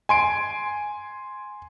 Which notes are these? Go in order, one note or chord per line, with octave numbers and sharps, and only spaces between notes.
G#5 C6 D7